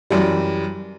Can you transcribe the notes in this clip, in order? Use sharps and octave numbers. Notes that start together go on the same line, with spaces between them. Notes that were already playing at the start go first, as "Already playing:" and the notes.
F#2 E3 G3